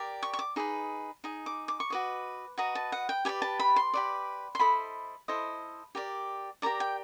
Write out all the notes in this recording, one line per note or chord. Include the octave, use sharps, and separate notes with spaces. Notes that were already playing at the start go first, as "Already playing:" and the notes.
Already playing: G4 A#4 D5
C#6
C#6
D6
D#4 G#4 B4
D#4 G#4
D6
D6
C#6
F#4 B4 D#5 D6
F#4 B4 D#5 A#5
A5
F#5
G5
G4 B4 D5 G#5
A5
B5
C6
G4 B4 D5
C6
E4 A4 C5 D#5 B5
E4 A4 C5 D#5
G4 A#4 D5
G4 A#4 D5 A#5
G5